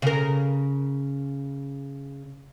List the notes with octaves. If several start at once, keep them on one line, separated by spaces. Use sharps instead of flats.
C#3 A#4